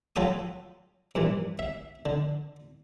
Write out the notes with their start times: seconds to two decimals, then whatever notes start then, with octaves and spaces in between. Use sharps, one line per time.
0.16 F#3 F4 A4 G5 D#6
1.15 G2 A#2 E3
1.59 E5
2.06 D3